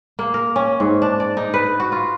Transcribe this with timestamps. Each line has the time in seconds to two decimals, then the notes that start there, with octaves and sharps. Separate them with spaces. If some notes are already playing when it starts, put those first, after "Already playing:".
0.19 A#3
0.34 A#4
0.56 C#4
0.80 G#2
1.02 D4
1.20 D5
1.37 D#4
1.54 B4
1.80 F#4
1.92 F4